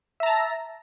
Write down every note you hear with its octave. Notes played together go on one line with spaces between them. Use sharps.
E5 A5 A#5 A#6